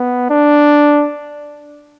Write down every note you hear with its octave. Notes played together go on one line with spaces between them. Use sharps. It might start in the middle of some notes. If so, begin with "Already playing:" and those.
Already playing: B3
D4